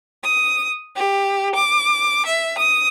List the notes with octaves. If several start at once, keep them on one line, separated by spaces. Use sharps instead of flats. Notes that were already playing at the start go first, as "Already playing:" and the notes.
D#6
G4
D6
E5
D#6